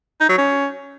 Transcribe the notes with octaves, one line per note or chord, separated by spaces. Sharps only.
D#4
F#3
C#4